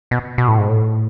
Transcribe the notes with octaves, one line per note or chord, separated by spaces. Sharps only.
B2
B2
A2
G#2
A2